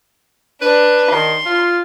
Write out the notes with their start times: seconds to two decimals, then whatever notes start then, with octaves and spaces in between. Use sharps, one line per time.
0.61 D4 B4
1.11 D#3 C6
1.46 F4